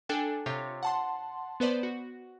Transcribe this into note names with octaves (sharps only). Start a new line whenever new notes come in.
D4 A4 G5 G#5
C3 F4 C#5
F#5 A5 C6
B3 B4 C5 D5
F#4